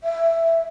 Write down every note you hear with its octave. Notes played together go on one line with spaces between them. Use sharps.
E5